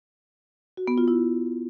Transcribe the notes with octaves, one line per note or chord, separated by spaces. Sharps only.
F#4
B3
F4
E4